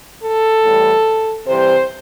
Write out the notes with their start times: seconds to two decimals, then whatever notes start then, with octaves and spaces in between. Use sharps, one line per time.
0.23 A4
0.64 A2 E3 G3
1.47 C3 E3 G3 C5